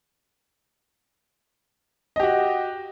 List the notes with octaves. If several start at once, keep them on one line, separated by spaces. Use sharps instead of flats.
F#4 G4 D#5